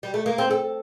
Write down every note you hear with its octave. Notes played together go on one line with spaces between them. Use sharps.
G3
A3
A#3
C4
A4